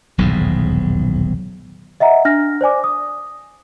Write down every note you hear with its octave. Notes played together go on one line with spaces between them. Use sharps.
D#1 B1 E2 G#2
D#5 E5 F#5 A#5
D4 F6 A#6
C5 D5 G#5 D6
D#6